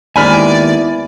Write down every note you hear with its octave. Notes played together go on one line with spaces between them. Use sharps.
D#2 G#3 B3 E4 D5 G#5 B5 F6